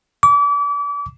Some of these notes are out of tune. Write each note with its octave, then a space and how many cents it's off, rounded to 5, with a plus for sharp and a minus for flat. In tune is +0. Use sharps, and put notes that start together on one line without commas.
D6 -35